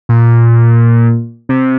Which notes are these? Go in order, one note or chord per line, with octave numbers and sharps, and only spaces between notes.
A#2
C3